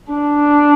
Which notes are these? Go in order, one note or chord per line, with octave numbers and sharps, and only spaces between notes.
D4